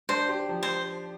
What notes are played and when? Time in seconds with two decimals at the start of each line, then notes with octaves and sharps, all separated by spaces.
0.09 D4 C5
0.29 G4
0.49 F3
0.63 C5